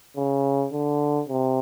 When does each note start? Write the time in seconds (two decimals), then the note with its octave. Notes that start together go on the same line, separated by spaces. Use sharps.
0.17 C#3
0.73 D3
1.29 C3